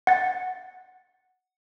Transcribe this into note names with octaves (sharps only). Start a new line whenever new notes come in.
F#5 A6